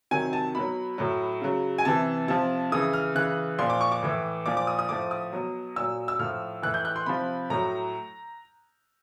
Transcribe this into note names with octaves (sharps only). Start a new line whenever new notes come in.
C3 D#3 F#3 G#5
A5
B2 F#3 B5
A2 F#3
C#3 F#3
G#5
C3 E3 A5
C3 F3 A5
C#3 E3 D#6
F6
C#3 E3 F#6
A#2 F3 C6
D6
C#6
D6
A2 E3
A#2 F3 D6
D6
D#6
D#6
A2 F3 D6
D#6
B2 F#3
A#2 F#3 E6
E6
A2 F3 F6
A2 E3 F#6
G6
F#6
C6
C3 F3 B5
A2 F#3 A#5